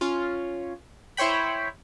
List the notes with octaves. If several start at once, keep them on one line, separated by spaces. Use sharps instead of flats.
C#4 F4
E4 C5 C#5 G5 B5